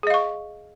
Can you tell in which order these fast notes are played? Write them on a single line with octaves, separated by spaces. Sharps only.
G#4 D#5 F5 C#6